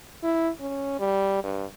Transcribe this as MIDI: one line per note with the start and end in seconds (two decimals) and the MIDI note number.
0.23 0.50 64
0.60 0.97 61
1.00 1.42 55
1.44 1.65 43